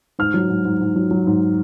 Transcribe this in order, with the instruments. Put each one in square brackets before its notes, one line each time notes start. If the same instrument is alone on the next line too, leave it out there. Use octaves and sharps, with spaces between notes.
[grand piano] G#2 F6
F#3
G#2
G#2
G#2
F#3
F#3
G#2